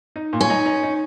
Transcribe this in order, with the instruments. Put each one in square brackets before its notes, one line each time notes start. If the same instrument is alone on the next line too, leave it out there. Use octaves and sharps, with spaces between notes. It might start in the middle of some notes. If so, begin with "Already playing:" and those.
[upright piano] D#4
A#2
[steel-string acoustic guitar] C#4
[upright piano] D#4
D#4
D#4